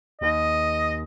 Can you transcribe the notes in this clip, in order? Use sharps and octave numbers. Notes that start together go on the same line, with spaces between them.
D#2 D#5